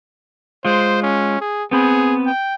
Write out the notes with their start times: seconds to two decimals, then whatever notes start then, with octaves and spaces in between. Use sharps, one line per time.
0.65 G#3 F4 C5
1.02 C#4
1.41 G#4
1.71 B3 C4 G#4 B5
2.26 G5